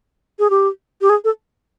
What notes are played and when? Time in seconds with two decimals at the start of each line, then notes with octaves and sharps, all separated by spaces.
0.39 G#4
0.50 G4
1.01 G4
1.10 G#4
1.24 A4